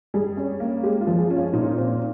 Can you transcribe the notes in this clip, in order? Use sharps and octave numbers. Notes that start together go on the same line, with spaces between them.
G3 G#4
C#4
A#3
G#3 G4
F4
F3
G#4
C#4
F4
A#2 D#4
C4